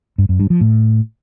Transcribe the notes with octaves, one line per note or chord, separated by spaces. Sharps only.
G2
F#2
G2
F3
A2